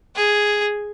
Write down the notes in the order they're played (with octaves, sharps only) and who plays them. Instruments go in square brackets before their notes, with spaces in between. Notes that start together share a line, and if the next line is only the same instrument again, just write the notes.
[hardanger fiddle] G#4